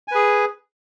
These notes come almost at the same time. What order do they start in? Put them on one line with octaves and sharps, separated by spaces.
G#5 B4 G#4